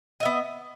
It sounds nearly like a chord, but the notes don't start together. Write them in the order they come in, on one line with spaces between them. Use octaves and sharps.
D#5 E5 B3